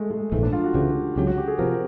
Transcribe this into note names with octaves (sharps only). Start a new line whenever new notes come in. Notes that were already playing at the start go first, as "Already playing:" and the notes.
Already playing: G#3 A3
G#3
A#1 G#2 E3 A3
D4
F4
F#4
C#2 C#3 E3 G4
C#2 C#3 F#3 G4
F#4
G4
G#4
C3 F3 A#4